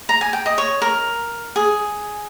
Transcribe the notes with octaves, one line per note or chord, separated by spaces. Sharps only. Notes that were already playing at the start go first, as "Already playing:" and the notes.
A#5
G#5
G5
D#5
C#5
A#4
G#4